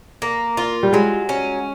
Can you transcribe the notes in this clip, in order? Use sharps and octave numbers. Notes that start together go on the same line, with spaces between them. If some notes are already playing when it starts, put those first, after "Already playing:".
A#3
F4
G3
F#3 G#3
C#4